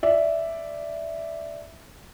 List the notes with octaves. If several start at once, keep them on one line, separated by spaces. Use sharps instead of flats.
D5 E5